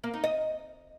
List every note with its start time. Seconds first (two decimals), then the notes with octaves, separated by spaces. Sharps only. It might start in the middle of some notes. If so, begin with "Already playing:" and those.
0.04 A#3
0.14 D#4
0.24 D#5